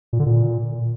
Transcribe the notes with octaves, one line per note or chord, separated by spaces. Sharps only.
A#2
D3
A#2